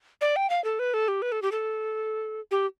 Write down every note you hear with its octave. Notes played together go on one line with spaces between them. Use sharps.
D5
G5
F5
A4
B4
A4
G4
B4
A4
G4
A4
G4